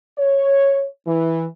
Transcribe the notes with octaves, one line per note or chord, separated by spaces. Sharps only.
C#5
E3